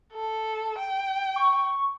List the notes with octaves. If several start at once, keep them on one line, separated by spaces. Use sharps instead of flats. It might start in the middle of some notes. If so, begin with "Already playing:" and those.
A4
G5
C#6